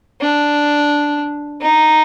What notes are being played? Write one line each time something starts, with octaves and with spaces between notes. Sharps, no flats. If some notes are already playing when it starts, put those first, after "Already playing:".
D4
D#4